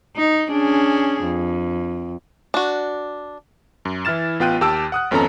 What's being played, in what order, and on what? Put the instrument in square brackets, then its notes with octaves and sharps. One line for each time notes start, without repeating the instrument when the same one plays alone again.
[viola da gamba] D#4
C#4 D4 G#4
F2
[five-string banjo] D4 F#4
[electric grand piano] F#2
E3 E4 F6 A6 E7
A1 B3 F4 G5 F#6 D#7
D#2 G4 A5 E6 D7
F#5 D#6 F#6
G#1 F2 B3 C#4 A4 A#5